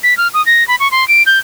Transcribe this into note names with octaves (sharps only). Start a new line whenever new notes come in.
B6
F6
D#6
A#6
B5
C#6
C6
D7
G6